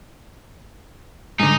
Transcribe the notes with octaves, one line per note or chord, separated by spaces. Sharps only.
G#2 D3 D#4